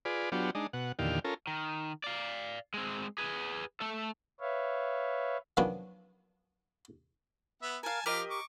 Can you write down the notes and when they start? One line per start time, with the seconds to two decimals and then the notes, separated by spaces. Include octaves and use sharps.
0.05 F4 G#4 B4 D5
0.32 F#3 B3 D4 F4 G4
0.55 G#3 D4 D#4
0.73 B2 F#5
0.99 E2 A#2 D3 D#3 G4 F5
1.24 C#4 F4 A4 A#4
1.47 D#3
2.04 D5 F5
2.74 G#3 C4
3.18 G#4 B4
3.81 A3 A4
4.40 B4 C#5 E5 F5
5.57 D#3 F3 F#3 B3 C#4 D4
7.62 B3 E5 F#5
7.83 A#4 F5 G#5 A5
8.06 F3 G4 A#4 D#5 D6 F6
8.30 C#6 D6